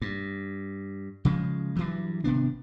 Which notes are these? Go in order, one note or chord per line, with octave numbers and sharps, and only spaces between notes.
G2
C#3 F3 G#3
G2 E3 F#3
G#1 C3 B3 D4